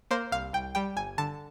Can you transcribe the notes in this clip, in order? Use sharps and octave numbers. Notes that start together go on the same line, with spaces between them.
A#3 C5
C2 F5
C2 G5
G3 G5
G1 G#5
D3 A5